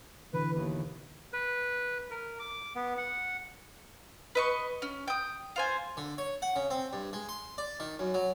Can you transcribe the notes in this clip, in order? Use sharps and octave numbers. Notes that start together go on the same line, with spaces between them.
B2 D3 E3 B4
D#2
B4
A#4
D6
B3
F#5
B4 D#5 C#6
C#4
G5 D#6
F4 C5 G#5
D3
C#5
F#5
C#3
C4
G2
G#3
C6
D5
D#3
F#2
F#3